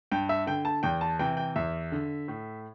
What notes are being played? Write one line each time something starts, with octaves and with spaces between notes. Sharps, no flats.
G2 G5
E5
D3 G5
A5
E2 G5
A5
C3 E3 G5
G5
E2 E5
D3
A2